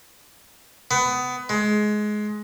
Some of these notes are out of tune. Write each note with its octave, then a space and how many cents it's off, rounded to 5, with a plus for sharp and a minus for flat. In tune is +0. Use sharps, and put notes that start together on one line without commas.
B3 +20
G#3 +20